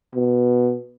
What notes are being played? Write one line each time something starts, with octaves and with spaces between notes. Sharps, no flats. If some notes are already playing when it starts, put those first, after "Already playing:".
B2